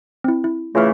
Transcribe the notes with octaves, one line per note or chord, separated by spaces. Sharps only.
C4 E4
E4
C#3 E3 A3 F4 F6